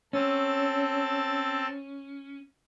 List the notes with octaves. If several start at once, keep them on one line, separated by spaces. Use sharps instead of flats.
C4 C#4 A4 A6